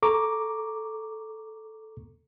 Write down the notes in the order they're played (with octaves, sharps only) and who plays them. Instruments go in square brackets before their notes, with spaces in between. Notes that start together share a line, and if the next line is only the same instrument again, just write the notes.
[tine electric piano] A4 A#5 C#6 D6